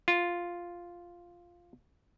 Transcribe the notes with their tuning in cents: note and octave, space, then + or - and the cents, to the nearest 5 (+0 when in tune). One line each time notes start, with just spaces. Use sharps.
F4 +0